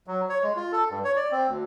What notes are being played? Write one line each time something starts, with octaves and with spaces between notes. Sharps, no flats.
F#3
C#5
G#3
F4
A4
G2
C#5
D5
C4
D2